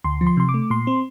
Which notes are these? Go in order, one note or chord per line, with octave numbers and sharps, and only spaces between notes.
D2 C6
F3
C6
C3 C6
D6
A3
A#2 C6
C4